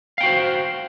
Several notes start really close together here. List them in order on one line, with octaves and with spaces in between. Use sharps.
F5 G5 F#4 C5